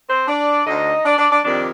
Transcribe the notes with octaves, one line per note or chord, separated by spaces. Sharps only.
C4 C5
D4 D5
D2 D3 D#4 D#5
D4 D5
D4 D5
D4 D5
F2 C3 D#3 D4 D5